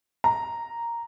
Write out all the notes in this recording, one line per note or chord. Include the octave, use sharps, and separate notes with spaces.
A#5